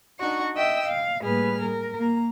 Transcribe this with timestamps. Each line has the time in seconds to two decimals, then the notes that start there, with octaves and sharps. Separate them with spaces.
0.19 D4 D#4 F#4 C#6
0.56 D#5 E5 G5 E6
0.86 F5
1.21 A2 G3 A#3 G#4 B4 F6
1.61 A#4
1.98 A#3 A#5